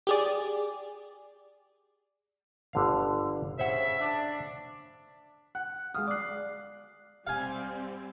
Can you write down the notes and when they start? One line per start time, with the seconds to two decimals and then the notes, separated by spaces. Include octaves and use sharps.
0.07 G4 G#4 D5
2.73 G1 D3 F5
3.59 C#3 C5 E5 F#5
4.00 D4
5.55 F#5 F#6
5.94 G#3 F5 D#6 F6
6.07 D5 D6 F#6 C7
7.27 G3 C4 F5 G#5